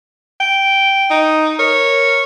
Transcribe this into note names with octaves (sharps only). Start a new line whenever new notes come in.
G5
D#4
A#4 C#5